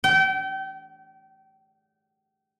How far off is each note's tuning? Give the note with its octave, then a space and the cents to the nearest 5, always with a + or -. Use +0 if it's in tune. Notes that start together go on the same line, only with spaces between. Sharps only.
G5 -30